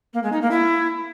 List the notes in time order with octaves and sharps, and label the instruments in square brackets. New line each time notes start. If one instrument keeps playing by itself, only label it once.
[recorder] A#3
G#3
D#4
A#3
E4